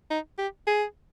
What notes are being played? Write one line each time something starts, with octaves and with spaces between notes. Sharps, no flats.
D#4
G4
G#4